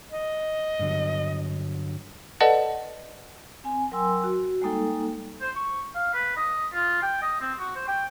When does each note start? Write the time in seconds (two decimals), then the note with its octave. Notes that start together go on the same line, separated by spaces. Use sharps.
0.10 D#5
0.79 G2 D3 F#3
2.40 A4 B4 D5 D#5 F#5 A5
3.64 C4 G#5
3.91 F#3 A#4 G5 G#5 C6 E6
4.24 F#4
4.62 G3 G#3 A#3 D#4 A4 G5
5.41 C5
5.56 C#6
5.95 F5
6.14 B4
6.37 D#5
6.73 F4
7.03 G5
7.22 D#5
7.41 C4
7.59 F#4
7.76 C5
7.88 G5